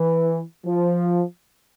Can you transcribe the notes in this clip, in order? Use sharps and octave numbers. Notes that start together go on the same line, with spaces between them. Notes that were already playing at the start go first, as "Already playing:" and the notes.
Already playing: E3
F3